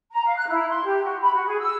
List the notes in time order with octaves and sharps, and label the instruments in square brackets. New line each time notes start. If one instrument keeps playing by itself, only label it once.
[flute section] A#5
F5
F#6
E4
C6
G4
F#4
B5
F#4
G#4
E6